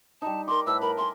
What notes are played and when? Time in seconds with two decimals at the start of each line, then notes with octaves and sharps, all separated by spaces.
0.22 G3 D#4 A5
0.48 A#4 C6 D6
0.67 A2 B4 A5 E6
0.81 A#4 B5
0.97 E5 G#5 C6